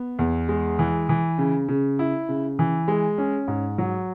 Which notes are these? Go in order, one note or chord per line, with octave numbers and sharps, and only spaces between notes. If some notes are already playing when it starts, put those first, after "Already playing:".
Already playing: B3
E2
G#3
E3
E3
C#3
C#3
E4
C#3
E3
G#3
C#4
G#2
F#3